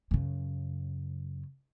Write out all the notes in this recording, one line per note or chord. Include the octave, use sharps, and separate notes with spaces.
F#2 C#3